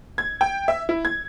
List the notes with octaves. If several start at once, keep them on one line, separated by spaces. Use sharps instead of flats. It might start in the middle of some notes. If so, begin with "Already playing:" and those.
G#6
G5
E5
E4
G#6